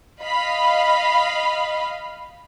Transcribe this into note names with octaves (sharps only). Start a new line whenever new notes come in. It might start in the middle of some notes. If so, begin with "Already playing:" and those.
D#5 F5 B5